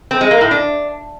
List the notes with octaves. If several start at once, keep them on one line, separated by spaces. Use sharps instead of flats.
C4
G#3
A#3
A2
D4